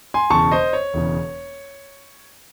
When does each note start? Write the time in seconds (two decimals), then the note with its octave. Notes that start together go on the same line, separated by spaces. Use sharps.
0.14 G#5 C6
0.30 E1 E2 C#3 A5 C#6
0.52 C5 D#5
0.73 C#5
0.94 E1 E2 C#3